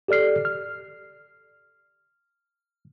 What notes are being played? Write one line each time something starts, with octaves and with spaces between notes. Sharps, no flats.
G4 A4 D5 F6 C7
F6